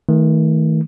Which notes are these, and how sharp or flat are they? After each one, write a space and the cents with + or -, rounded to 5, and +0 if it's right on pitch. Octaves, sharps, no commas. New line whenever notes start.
D#3 +40 A3 +15